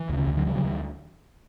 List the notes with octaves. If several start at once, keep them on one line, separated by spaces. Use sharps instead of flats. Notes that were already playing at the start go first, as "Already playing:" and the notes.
Already playing: E3
D2 C#3
D2
D3 F#3
C#3 E3 G3
D3 F#3
D2 E3 G3